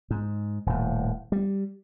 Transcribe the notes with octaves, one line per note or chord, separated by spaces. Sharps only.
G#2
D#1 A2
G3